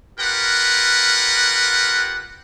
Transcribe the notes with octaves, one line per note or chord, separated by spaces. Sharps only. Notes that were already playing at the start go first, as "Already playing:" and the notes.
F4 G4 A#4 B4 F#5